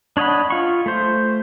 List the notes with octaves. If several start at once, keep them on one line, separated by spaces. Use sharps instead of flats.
D4 C#5 D#5 F#5 B5
F4 C#6
A3 C5